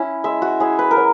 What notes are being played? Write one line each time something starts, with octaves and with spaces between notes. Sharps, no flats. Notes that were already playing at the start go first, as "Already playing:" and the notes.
Already playing: C#4 E4
G#3 E5
F#4
C#4 E4 G#4
B4
A#4
F#3